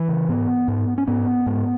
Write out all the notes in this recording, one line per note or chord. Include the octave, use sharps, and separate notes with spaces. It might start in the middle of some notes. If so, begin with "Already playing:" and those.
Already playing: E3
C#3
G#2 B3
G#2
C#4
G#2 B3
G#2